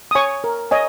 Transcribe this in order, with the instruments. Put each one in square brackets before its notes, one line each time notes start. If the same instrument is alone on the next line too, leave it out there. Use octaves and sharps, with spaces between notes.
[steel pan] D#6
C#5 G#5 C#6
A#4
C#5 D#5 G#5